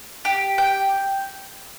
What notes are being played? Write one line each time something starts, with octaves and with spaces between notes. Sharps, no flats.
G4
G5